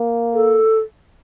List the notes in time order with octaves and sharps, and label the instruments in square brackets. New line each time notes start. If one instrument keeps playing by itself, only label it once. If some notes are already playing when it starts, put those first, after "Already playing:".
Already playing: [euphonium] A#3
[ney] A4